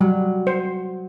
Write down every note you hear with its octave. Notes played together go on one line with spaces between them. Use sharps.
F#3 G3
C5